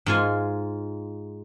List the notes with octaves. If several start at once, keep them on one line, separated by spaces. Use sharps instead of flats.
G#2 F4 G#5